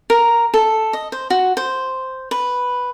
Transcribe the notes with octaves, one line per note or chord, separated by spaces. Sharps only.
A#4
A4
D#5
C5
F#4
C5
B4